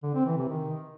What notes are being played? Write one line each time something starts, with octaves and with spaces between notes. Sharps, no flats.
D3
C4
E3
C3
D#3